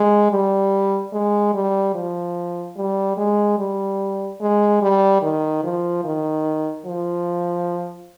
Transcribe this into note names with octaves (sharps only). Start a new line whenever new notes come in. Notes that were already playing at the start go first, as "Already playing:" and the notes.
Already playing: G#3
G3
G#3
G3
F3
G3
G#3
G3
G#3
G3
D#3
F3
D#3
F3